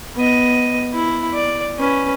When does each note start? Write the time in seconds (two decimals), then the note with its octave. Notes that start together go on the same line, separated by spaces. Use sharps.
0.16 B3 D#5
0.94 E4
1.34 D5
1.79 C#4 B4